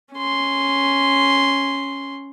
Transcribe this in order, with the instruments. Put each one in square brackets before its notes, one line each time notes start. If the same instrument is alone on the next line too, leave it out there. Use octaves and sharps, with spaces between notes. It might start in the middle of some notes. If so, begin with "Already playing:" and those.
[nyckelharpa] C#4 C6